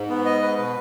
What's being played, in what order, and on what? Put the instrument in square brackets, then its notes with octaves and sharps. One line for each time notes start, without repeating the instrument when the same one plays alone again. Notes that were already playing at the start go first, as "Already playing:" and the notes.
Already playing: [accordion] G#2
[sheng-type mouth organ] B3
D#5
B4
[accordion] B2 [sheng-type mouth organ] B4